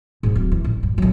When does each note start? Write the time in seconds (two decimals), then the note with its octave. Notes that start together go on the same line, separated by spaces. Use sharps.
0.23 G#2 G3
0.36 D1
0.52 E3
0.64 A1
0.83 G2
0.98 D1 F#3